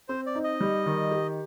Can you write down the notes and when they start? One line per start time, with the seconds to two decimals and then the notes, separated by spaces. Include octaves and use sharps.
0.09 C4 C5
0.26 D5
0.35 D#4
0.44 D#5
0.61 G3
0.86 D#3
1.11 G4